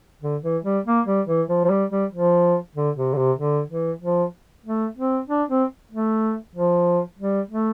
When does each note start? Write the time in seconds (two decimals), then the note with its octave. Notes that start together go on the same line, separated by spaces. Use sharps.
0.22 D3
0.43 E3
0.64 G3
0.86 A#3
1.06 G3
1.27 E3
1.49 F3
1.65 F3
1.70 G3
1.91 G3
2.12 F3
2.75 D3
2.96 C3
3.13 D3
3.17 C3
3.38 D3
3.70 E3
4.02 F3
4.65 A3
4.97 C4
5.29 D4
5.49 C4
5.91 A3
6.56 F3
7.19 G3
7.51 A3